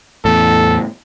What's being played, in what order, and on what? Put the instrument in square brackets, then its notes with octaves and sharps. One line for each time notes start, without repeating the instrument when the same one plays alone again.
[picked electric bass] E2 A2 [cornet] A4